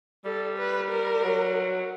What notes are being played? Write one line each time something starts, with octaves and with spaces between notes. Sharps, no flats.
G3 A4
B4
A#4
F#3